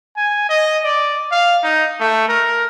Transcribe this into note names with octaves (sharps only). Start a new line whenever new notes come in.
G#5
D#5
D5
F5
D#4
A3
A#4